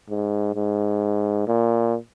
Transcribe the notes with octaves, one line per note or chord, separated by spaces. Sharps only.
G#2
G#2
A#2